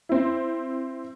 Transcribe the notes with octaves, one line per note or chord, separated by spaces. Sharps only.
C4 E4